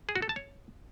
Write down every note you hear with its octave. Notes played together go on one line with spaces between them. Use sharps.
G#4
F#4
A4
A5
C#5